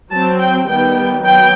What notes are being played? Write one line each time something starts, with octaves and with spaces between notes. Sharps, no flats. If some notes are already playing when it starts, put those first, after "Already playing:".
F#3 C4 A5
G5
D#3 G3 B3 G5
F#3 B3 G5